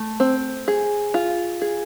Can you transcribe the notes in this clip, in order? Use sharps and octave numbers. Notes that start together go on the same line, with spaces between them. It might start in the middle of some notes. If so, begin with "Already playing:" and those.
Already playing: A3
C4
G#4
F4
G#4